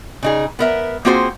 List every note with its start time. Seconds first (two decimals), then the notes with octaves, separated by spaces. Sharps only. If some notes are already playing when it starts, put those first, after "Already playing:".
0.23 C#3 D#4 G#4
0.59 B3 A#4 E5
1.05 A#3 C4 F4 F#4 G#4 C5